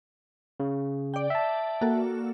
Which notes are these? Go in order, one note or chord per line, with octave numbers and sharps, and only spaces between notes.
C#3
D5 G5
E5 A5
A#3 F#4 A4